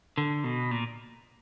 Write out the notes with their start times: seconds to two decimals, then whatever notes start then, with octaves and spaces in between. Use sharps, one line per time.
0.18 D3
0.44 B2
0.71 A#2